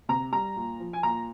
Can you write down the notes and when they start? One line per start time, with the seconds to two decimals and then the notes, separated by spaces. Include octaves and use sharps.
0.09 C3 A#5
0.32 G3 A#5
0.56 A#2
0.80 F3
0.93 G#5
1.03 A#2 A#5